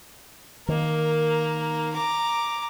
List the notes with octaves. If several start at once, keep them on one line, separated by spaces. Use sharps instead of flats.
D#3 A#3 A#5
A#5 D6